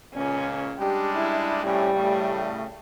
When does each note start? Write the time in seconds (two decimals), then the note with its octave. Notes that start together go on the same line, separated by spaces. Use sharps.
0.15 C#2 A#2 C#3 C#4
0.78 G3 G#3 D4 G4
1.15 E4
1.63 A2 C3 G3 C#4
1.95 A2 C#3 A3